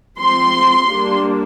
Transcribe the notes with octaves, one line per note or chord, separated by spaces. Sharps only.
F3 C4 C6
G3 A#3 D4